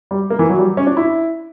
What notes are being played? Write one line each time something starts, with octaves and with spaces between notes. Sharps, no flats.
G3
A#3
E3
F#3
G3
C#4
D4
E4